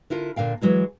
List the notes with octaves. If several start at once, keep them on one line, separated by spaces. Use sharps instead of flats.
D3 E4 F4 A#4
A#2 D3 F5 G5
E3 F#3 G#3 E4